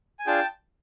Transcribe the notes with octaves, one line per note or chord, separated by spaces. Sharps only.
G#5
D4 F4 G#4 G5 A5